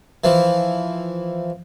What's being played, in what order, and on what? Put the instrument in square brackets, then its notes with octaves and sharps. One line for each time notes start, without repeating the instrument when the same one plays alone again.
[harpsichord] E3 F3